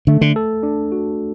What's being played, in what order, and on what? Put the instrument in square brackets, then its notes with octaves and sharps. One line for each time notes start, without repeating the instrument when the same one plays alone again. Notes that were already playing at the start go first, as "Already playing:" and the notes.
[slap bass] D3 [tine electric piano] A3
[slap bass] D3
[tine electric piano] A4
D4
F#4